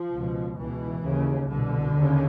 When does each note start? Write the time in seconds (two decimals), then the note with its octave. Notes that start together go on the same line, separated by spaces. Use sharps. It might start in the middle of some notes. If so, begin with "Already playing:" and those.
Already playing: F3
0.13 C#2 B2
0.58 C#2 B2 E3
1.04 D#2 C#3
1.49 C2 B2 D3
1.95 D#2 C#3